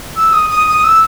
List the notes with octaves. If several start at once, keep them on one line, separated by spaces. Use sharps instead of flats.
E6
D#6
D#6
D#6
E6